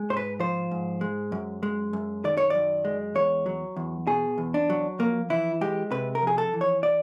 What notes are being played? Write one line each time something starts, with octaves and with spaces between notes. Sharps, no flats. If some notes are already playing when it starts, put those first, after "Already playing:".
Already playing: G#3
G#2 C5
B4
F3 C5
G#2
G#3
F#2
G#3
F#2
D#3 D5
C#5
F#2 D5
G#3
E2 C#5
F#3
E2
B2 G#4
E2
D4
F#3
F2 A#3
E3 E4
G#3 G4
C3 B4
A#4
F2 G#4
A4
E3
C#5
D5